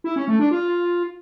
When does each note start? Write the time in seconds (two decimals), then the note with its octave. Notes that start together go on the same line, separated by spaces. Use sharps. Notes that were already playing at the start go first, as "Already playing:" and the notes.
0.04 E4
0.16 C#4
0.28 A3
0.39 D4
0.51 F4